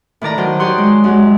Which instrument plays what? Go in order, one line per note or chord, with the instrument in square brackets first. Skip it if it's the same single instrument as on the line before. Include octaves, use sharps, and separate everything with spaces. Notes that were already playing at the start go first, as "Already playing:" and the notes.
[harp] A2 D#3 D5 A#5
D#3 F#3 C5
G4 C#5 D5 C6 D#6 F#6
G#3
F#2 G#3